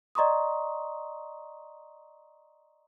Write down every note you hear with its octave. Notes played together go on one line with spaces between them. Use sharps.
D5 D#5 A#5 C6 C#6 D#6